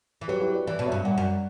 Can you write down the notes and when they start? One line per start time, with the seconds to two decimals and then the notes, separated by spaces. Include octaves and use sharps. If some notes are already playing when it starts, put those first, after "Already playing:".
0.21 E3
0.28 F#3 G4 B4
0.41 E4 G4
0.53 B4 D5
0.66 E3 B4 D5
0.79 B2
0.85 C#5 E5
0.92 G2
1.05 A#2 D5 F#5
1.18 F#2